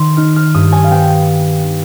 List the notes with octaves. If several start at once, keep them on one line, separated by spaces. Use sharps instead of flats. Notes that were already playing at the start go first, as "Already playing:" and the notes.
Already playing: D#3 C6
D#4 F6
F6
G2 D#6
G#5
F5
B3 G5